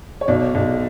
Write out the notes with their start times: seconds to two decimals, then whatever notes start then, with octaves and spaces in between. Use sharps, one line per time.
0.21 C#5
0.28 B1 D5
0.55 B1